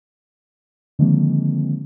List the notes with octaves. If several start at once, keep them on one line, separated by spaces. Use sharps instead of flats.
D3 D#3 F3 G#3 A#3 C4